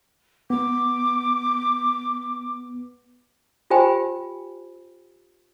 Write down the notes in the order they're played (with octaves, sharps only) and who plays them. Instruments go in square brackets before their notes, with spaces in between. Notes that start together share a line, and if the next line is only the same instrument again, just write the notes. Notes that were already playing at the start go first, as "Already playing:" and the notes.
[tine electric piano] B3 [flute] D6
[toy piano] F4 G4 C5 G5 G#5 B5